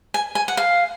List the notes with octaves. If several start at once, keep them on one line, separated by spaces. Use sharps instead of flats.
G#5
G#5
F#5
F5